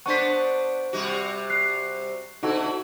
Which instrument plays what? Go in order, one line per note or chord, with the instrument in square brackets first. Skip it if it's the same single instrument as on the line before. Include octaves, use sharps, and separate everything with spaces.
[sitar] B3 D4 C5 [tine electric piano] F#5 [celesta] C#6 B6
[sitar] C3 G3 F#4
[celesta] F#6 C7
[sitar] B2 D3 E4 [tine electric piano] D#4 F#4 A4